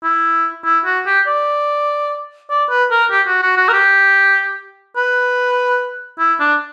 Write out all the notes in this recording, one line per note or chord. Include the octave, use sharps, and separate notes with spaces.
E4
E4
F#4
G4
D5
D5
B4
A#4
G4
F#4
F#4
F#4
A#4
G4
B4
E4
D4